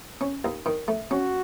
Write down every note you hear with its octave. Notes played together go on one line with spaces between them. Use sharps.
C#4
D#2
D#3
A3
C#4 F#4